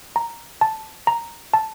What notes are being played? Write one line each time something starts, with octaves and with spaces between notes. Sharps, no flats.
A#5
A5
A#5
A5